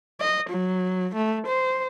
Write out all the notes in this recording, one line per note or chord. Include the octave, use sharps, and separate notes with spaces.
D#5
F#3
A3
C5